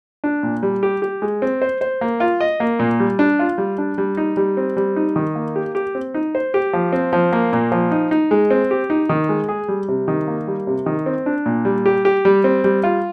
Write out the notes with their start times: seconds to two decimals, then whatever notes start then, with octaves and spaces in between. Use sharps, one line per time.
0.24 D4
0.43 A#2
0.63 G3
0.83 G4
1.02 G4
1.22 G#3
1.42 C4
1.62 C5
1.81 C5
2.01 A#3
2.20 F4
2.41 D#5
2.60 A#3
2.79 A#2
3.00 G3
3.19 D4
3.39 F4
3.58 G3
3.78 D4
3.98 G3
4.17 D#4
4.37 G3
4.57 C4
4.77 G3
4.96 D#4
5.16 D#3
5.36 A#3
5.56 G4
5.75 G4
5.95 C4
6.14 D#4
6.35 C5
6.54 G4
6.73 F3
6.93 C4
7.13 F3
7.33 A#3
7.53 A#2
7.72 F3
7.91 D#4
8.11 D#4
8.31 G#3
8.50 C4
8.71 G4
8.90 D#4
9.09 D#3
9.29 G#3
9.49 G#4
9.68 G3
9.88 C3
10.08 D#3
10.28 A#3
10.48 G3
10.67 C3
10.86 D#3
11.06 C4
11.26 D4
11.46 A#2
11.65 G3
11.86 G4
12.05 G4
12.25 G3
12.44 C4
12.64 G3
12.84 F4